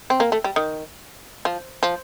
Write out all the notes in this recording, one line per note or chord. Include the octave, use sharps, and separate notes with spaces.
C4
A#3
A3
G3
D#3
F3
F3